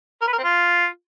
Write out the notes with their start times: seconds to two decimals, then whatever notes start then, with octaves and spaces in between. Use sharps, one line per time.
0.22 A#4
0.27 B4
0.33 A#4
0.38 C4
0.44 F4